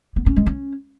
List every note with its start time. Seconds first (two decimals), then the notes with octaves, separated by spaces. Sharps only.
0.16 B3
0.26 C#4
0.36 G#3
0.46 C#4